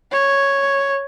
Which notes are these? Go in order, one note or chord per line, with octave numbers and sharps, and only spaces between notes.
C#5